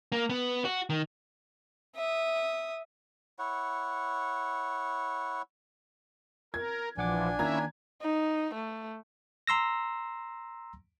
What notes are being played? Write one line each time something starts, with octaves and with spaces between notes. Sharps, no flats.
A#3
B3
F#4
D#3
E5 D#6
E4 C#5 F#5
A#4 G#6
A#1 E3 F3 D4 F#5 G#5 D6
D#3 A#3 C#4 E4 E5 A#5 G#6
D#4
A3
A#5 C6 E6 A#6